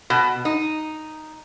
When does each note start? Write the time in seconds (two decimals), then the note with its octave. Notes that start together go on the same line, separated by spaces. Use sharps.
0.10 B2
0.45 D#4